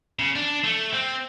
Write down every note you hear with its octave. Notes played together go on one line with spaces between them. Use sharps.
C#3
D4
A3
C4